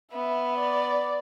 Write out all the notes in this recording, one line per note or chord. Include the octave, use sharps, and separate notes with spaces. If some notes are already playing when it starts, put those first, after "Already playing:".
B3 E5
D5